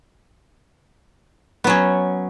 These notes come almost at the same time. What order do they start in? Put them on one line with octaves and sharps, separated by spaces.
B3 F#3 C#4